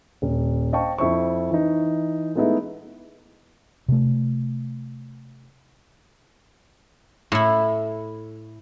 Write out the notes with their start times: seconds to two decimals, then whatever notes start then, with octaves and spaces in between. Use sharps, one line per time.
0.22 D#1
0.72 C5 D#5 F5 G5 A5 C#6
0.98 F2 E4 C5 C#6
1.51 E3 D#4
2.35 G#3 A3 B3 D#4 E4
3.88 C3 A3
7.32 A2 E4